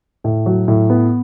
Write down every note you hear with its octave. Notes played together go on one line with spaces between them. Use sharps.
A2
F#3
A2
B3